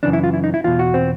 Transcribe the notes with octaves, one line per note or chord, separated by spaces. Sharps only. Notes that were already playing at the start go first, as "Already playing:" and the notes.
F#2 C#3 E3 D4
E4
F4
E4
D#4
E4
E2 B2 F4
F#4
C4